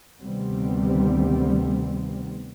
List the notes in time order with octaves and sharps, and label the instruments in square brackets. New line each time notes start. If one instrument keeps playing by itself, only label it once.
[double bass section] D2 C3 D#3 G3 B3 C4